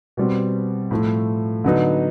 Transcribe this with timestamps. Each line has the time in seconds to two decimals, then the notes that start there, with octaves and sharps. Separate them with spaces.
0.17 B2 G3 C4
0.91 A2 F3 A3
1.64 D3 F#3 B3 D#4